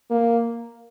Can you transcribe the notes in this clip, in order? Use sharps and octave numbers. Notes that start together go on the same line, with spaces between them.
A#3